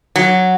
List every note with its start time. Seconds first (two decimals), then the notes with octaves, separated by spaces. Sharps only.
0.16 F#3